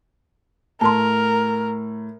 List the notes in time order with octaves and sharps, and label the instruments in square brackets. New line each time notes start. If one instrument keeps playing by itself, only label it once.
[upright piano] A2 [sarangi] A#4 [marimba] A5 C6